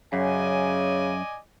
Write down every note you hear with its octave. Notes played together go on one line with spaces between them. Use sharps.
F#2 C#3 D5 D#5 G#5